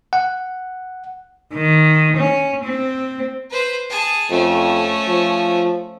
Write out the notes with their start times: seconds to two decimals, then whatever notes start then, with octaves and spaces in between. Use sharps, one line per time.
0.13 F#5
1.54 D#3
2.17 C#4
2.64 C4
3.51 B4 C5
3.90 G#4 A5
4.31 F2 A3 C#4
5.08 F3